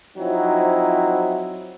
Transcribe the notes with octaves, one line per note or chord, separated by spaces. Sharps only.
F3 F#3 C4 D#4 E4